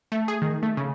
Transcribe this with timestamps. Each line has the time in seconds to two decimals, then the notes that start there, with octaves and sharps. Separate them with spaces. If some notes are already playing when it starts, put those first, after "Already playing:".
0.12 A3
0.28 G#4
0.42 D#3
0.63 A3
0.77 C#3